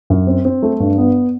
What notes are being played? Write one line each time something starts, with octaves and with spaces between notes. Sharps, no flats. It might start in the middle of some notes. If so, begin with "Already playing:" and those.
F#2
C4
C4
A3
G2
B3